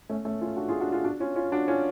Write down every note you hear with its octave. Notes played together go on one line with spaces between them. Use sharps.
A3 C#4
A3 C#4
C#4 F4
D4 F#4
F4 G#4
D4 F#4
F4 G#4
D4 F#4
C#4 F4
C#4 F4
D4 F#4
C#4 F4